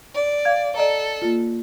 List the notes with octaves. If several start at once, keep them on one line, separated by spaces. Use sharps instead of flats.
D5
F5 G#6
A4 D5 D#5 A#5
A#3 F4